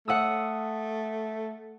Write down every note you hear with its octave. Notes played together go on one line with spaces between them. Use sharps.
A3 F#5 D#6 E6